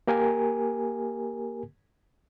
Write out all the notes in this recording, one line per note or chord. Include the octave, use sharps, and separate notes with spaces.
A#3 G4 A#4 G#5